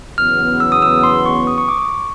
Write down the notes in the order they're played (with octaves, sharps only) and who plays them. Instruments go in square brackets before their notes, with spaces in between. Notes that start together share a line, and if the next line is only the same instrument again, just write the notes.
[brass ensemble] E2 C#3 F#3 B3 [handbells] F6
[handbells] E6
D#6
E6
C6
C#6
D#6
C#6
D6
C#6